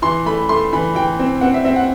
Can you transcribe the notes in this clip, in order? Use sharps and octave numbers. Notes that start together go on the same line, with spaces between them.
E3 C6
A3 B5
A3 C6
E3 B5
E3 G5
C4
C4 F#5
E5
C4 E5
F#5